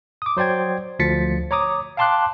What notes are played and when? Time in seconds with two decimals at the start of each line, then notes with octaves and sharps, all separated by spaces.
0.22 D6 D#6
0.37 F#3 C5 D5 G5 G#6
0.99 D2 F3 A6 B6 C#7
1.51 C#5 A#5 D6 D#6
1.97 F5 G5 A5 C6 D6 F#6